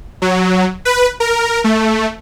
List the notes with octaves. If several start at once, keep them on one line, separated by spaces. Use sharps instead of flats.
F#3
B4
A#4
A3